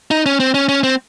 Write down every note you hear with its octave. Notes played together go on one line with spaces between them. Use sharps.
D#4
C#4
C4
C#4
C#4
C4